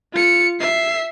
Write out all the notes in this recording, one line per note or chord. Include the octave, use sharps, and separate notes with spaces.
F4 C#7
E5 C7